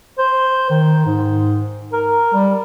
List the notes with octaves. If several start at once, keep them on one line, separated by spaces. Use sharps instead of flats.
C5
D#3
G#2
A#4
G3